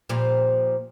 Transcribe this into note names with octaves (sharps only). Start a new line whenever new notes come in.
A#2 F3 G3